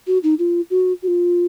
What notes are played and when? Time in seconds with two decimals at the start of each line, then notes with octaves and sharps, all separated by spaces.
0.07 F#4
0.23 D#4
0.39 F4
0.70 F#4
1.03 F#4
1.08 F4